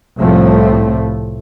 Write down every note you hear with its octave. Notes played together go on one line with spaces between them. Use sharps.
C2 A2 F3 A3